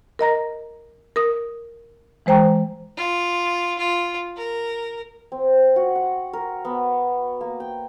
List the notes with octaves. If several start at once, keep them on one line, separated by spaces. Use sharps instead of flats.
A#4 D#5 A#5 A#6
A#4 D#6
E3 G#3 C5 G5 A#5
F4
F4
A#4
C4
F#4
F#5
A#4
B3
A#3
G5